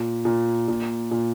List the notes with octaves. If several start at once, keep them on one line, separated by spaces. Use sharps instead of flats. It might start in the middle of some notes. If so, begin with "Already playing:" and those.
Already playing: A#2
A#2
A#2
A#2